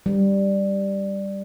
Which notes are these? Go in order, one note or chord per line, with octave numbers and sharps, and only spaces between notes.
G3